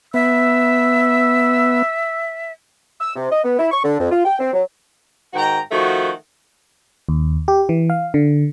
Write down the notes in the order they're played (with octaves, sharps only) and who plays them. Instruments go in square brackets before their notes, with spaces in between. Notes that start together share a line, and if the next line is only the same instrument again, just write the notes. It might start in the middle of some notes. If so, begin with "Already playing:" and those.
[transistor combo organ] B3 [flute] E5 [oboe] E6
[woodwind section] E6
C3
D#5
B3
E4
C#6
D3
F2
F4
G5
C4
F#3
[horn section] G#2 D#3 F#4 G5 A#5
D#3 F3 A3 F#4
[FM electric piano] D#2
G4
E3
F5
D3